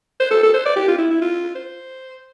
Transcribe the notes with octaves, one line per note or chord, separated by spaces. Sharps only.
C5
A4
A4
C5
D5
G4
F4
E4
E4
F4
C5